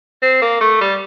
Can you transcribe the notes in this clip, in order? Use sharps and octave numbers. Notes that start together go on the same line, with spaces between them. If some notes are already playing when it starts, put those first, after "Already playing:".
C4
A#3
A3
G3